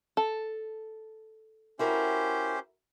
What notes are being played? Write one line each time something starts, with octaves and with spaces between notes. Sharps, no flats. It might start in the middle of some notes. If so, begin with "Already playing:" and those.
A4
C#4 E4 F#4 G4 A#4 C5